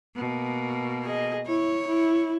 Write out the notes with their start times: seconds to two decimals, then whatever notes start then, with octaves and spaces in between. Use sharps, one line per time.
0.16 B2 A#3
1.05 G#4 D#5
1.47 E4 C#5
1.88 E4